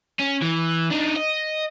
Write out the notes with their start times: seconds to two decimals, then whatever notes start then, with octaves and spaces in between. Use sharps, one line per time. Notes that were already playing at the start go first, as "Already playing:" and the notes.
0.19 C#4
0.42 E3
0.90 D4 D#4
1.16 D#5